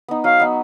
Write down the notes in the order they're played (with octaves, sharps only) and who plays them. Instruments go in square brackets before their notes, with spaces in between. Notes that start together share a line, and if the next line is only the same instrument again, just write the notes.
[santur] B3 D#4
[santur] F#3 [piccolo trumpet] F5
[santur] B3 D#4